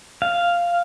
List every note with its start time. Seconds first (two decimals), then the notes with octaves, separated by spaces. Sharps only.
0.22 F5